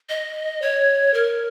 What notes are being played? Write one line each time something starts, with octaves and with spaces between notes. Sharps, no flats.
D#5
C#5
A#4